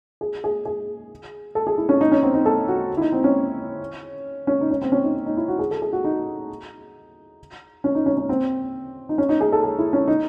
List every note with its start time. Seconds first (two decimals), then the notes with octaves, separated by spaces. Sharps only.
0.21 G#4
0.44 G#4
0.65 G#4
1.55 A4
1.67 G#4
1.78 E4
1.89 C#4
2.01 D#4
2.12 C#4
2.23 C4
2.34 D#4
2.45 A4
2.68 F#4
2.97 E4
3.01 D#4
3.12 C4
3.24 C#4
4.47 C#4
4.61 D#4
4.70 C#4
4.82 C4
4.92 C#4
5.03 D#4
5.26 D#4
5.37 E4
5.48 F#4
5.59 G#4
5.71 A4
5.82 G#4
5.93 F#4
6.04 D#4
7.84 C#4
7.95 D#4
8.06 C#4
8.17 C#4
8.29 C4
9.09 D#4
9.18 C#4
9.29 D#4
9.41 G#4
9.52 A4
9.63 G#4
9.79 E4
9.93 C#4
10.08 D#4